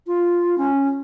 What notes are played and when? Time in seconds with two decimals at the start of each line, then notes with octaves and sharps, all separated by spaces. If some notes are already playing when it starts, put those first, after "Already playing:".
0.07 F4
0.58 C#4